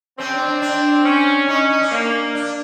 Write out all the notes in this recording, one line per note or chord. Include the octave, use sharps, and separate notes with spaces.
C4 C#4
D4
D4
D4
C#4
C#4 D#4
D#4
D4
A#3
D4